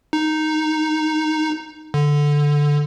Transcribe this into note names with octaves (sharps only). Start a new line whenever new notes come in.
D#4
D3